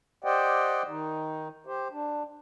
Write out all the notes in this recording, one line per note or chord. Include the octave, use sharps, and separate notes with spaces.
G4 C5 D5 D#5 F#5 G5
D#3 D#4
G4 C5
D4